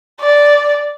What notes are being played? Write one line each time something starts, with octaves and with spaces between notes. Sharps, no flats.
D5